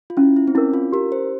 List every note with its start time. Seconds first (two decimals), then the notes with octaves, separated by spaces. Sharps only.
0.10 F4
0.17 C#4 E4
0.36 E4
0.48 C4
0.55 C#4 E4 A#4
0.73 F4
0.92 G4 A#4
1.12 C5